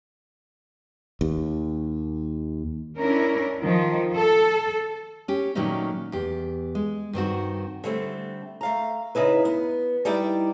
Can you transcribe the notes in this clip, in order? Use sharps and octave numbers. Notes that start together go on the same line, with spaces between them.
D#2
C#4 D4 E4 A#4
D#3 F3
A4
C#4 G4
A#2 D#3 F#3 A3 C#4 D#4
E2 G4
G#3
G2 D#3 C4 F#4
D3 G3 A3 C4
A3 F5 A#5
C#3 D#4 E4 B4
B3
G3 D#4 E4 D5 G5